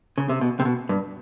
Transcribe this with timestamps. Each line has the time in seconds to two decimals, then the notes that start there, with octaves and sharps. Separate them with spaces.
0.18 C#3
0.29 C3
0.41 B2
0.60 C3
0.65 B2
0.89 G2